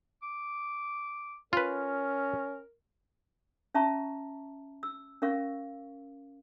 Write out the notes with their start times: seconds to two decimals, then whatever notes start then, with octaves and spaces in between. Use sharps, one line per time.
0.22 D6
1.53 C#4 F4 A#4 B4
3.74 C#4 E5 A5 A#5 C#6
4.83 E6
5.22 C#4 A#4 F5 C#6